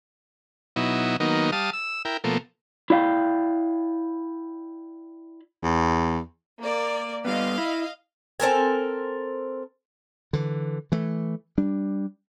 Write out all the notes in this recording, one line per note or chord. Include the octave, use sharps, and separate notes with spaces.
B2 F#3 D#4 E4
D#3 F#3 A#3 B3 D#4
G3 F5 A5 D#6
E6
E4 A#4 G5
B2 F3 A3 A#3
E4 D5 F5 G5
E2
A#3 D5
G3 B3 D#5 F5
E4
C4 A4 A#4 G#5
D3 E3
E3 A3
G3 D4